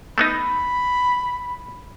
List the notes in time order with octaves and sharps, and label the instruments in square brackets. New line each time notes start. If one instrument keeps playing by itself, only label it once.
[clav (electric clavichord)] A3 B3 D#4 [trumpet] B5